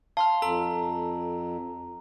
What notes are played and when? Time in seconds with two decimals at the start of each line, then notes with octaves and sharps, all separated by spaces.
0.17 F5 A5 C6 F6
0.42 F2 A4 A#5